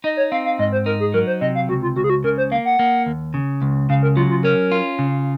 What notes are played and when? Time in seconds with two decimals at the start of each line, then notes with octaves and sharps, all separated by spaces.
0.04 D#4 D#5
0.17 C#5
0.31 C4 F5
0.45 F5
0.59 G#2 D#5
0.72 C5
0.86 D#4 A#4
1.00 G#4
1.14 F#3 A#4
1.27 C5
1.41 C3 D#5
1.55 F5
1.69 C#2 F#4
1.82 F4
1.96 C#2 F#4
2.04 G#4
2.10 F#4
2.24 C#3 A#4
2.38 C5
2.51 A#3 F5
2.65 F#5
2.79 A#3
3.06 D#2
3.34 C#3
3.62 C#2
3.89 C#3 F5
4.03 A#4
4.16 F#3 F4
4.30 F4
4.43 C#4 A#4
4.72 F4
4.99 C#3